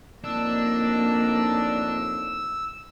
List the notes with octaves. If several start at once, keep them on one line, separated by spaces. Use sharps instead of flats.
F2 A2 A#3 D4 D#4 E6